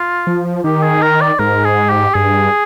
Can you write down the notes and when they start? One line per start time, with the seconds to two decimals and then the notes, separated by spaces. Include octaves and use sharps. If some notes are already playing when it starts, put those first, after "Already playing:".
Already playing: F4
0.27 F3
0.64 D#3 G4
0.83 G#4
1.02 A#4
1.21 D5
1.39 G#2 A#4
1.64 G#4
1.90 G4
2.14 G2 G#4